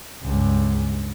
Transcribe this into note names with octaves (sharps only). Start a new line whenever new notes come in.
C#2 G2